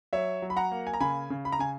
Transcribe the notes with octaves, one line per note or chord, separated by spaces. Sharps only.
F#3 C#5 E5
F#3
B5
F#5 A#5
A#3
G#5
A#5
C#3 G#5 B5
C#3
B5
A#5
C#3 G#5